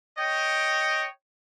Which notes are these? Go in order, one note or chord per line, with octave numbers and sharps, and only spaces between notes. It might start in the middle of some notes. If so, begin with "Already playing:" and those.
C#5 D#5 G5